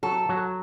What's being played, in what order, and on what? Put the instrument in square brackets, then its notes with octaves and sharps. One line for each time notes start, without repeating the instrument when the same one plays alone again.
[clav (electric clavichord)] F#3 [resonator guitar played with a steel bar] A4
[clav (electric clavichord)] F#3